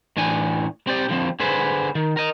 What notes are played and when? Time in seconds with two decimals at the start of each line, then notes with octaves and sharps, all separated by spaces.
0.17 A2 E3 D4 G#5
0.87 C4 G4 D5
1.09 D3 F3 C4
1.40 D3 G#4 B4 C5
1.95 D#3
2.17 A#4 D#5